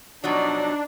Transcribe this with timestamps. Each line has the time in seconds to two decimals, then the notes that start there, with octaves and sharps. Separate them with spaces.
0.24 B2 F3 F#3 D4 D#4 D5